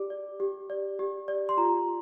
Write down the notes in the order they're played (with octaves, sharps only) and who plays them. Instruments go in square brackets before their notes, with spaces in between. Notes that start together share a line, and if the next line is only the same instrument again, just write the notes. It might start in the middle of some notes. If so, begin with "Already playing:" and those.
Already playing: [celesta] G4 D5 D6
D5
G4
D5
G4
D5
C6
F4 A#5